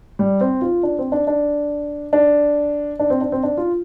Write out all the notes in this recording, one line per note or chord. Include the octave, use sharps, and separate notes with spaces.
G3
C4
F4
D4
C4
D4
D4
D4
D4
C4
D4
C4
D4
F4